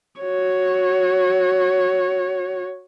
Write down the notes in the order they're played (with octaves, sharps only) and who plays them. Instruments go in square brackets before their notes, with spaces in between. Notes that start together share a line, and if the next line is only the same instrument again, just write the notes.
[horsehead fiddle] F#4 C#5